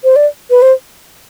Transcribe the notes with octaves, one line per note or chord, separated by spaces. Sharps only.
C5
D5
B4
C5